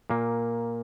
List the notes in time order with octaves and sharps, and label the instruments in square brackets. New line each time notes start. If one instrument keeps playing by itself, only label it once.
[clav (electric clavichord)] A#2 A#3